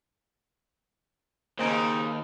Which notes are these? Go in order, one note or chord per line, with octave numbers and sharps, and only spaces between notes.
D#2 C#3 A#3 C4 D#4